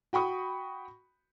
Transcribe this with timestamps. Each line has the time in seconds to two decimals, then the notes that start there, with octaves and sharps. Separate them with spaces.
0.13 F#4 G5 B5 C#6 D#6